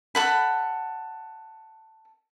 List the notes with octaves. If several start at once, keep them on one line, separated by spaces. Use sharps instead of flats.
A4 F#5 B5